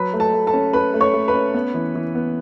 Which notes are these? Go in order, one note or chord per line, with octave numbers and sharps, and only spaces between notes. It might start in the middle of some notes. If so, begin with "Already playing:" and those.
Already playing: F#3 B4 B5
A3
A4 A5
A3
A4 A5
C#4
C#4 B4 B5
A3
C#5 C#6
A3
B4 B5
C#4
B3
E3
E3
B3